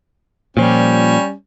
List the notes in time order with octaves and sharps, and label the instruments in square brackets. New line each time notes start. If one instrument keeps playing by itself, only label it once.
[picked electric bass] A#2 F3 [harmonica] G3 C#4